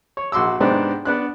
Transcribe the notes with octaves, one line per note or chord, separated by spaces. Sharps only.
C#5
A#1 F#4 C6 D6 E6
G#2 C3 B3 C4 D4
B3 D4 F#6